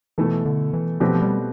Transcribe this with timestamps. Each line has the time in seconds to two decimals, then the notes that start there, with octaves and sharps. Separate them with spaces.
0.18 B2 E3 A3 E4 A4
0.45 D3
0.73 E3
1.00 B2 F3 A3 C4 G4 B4
1.15 F3
1.22 G3